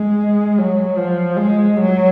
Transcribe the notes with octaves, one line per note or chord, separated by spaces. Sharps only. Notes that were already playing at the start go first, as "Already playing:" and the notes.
Already playing: G#3
F#3
F3
G#3
F#3